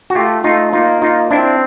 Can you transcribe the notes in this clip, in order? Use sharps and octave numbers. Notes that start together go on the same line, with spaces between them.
F#4
A3 F4 G4
A3 D#4 F4
A#3 D#4 F4
D#4 F4
C4 D4 E4